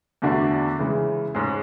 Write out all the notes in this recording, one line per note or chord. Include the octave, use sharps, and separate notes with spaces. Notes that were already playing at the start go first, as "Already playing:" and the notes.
E2 D3 A3 D4 F#4
C#3 E3 G#3
G#2 G#3 C#4 G#4